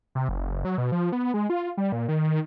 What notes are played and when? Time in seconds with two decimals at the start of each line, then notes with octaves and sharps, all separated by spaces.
0.15 C3
0.29 F#1
0.65 F#3
0.78 B2
0.92 F3
1.12 B3
1.34 G#3
1.50 F4
1.77 G3
1.92 A#2
2.08 D#3